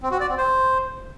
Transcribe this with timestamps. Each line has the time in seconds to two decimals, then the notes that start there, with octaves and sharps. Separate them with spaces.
0.03 C4
0.11 F#4
0.20 D5
0.29 C4
0.38 C5